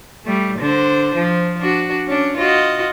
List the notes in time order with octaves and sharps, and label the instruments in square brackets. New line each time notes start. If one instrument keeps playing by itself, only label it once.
[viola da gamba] G3 A3
D3 D4 C5
F3
D4 F#4
C#4 D4
F4 F#4 D#5